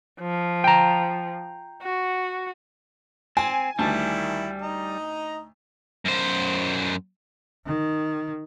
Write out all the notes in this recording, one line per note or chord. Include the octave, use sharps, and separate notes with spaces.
F3
G5 A#5
F#4
C4 G#5
D2 D#3 G3 E4 A5
D#4 D#5 A#5
F#2 C5
D#3